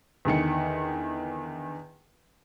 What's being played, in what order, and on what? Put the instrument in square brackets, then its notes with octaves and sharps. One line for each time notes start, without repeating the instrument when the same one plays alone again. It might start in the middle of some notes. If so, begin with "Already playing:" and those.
[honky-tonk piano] E2 D3 D#3 C#7